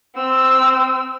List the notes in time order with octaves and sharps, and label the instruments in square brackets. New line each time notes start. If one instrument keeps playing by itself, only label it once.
[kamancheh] C4 E6